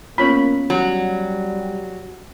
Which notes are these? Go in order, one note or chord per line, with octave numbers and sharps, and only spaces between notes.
A#3 B3 C#4 F4 C#5 B5
F#3 G3 G4